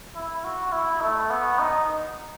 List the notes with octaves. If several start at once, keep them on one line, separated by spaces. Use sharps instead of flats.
E4
F#4
E4
A3
B3
D#4